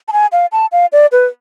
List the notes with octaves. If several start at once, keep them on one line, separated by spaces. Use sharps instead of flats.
A5
G#5
F5
A5
F5
D5
B4